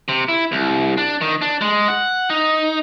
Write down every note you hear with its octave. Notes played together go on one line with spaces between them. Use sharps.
C3
E4
C2
D4
D#3
D4
G#3
F#5
D#4